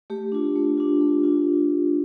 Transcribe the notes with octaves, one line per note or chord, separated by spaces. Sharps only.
A3 G4
D4 F4
A3
D4 F4
A3
D4 F4